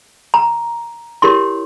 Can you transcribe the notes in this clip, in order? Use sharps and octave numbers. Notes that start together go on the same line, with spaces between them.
A#5
E4 G4 A#4 C#5 C6